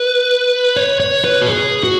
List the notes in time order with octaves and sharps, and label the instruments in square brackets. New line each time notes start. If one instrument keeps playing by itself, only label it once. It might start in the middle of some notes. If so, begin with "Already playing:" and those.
Already playing: [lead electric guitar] B4
C#5
C#5
B4
F#4
G#4
F#4